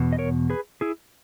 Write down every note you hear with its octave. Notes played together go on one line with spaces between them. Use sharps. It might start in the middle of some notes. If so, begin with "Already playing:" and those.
Already playing: E2 B2
D#5
A#4 C#5
G#4 B4
E4 G#4